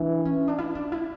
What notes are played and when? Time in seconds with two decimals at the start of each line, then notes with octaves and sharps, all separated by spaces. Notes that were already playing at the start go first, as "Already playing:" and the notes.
Already playing: E3 D4
0.25 C#4
0.48 D4
0.58 E4
0.75 D4
0.92 E4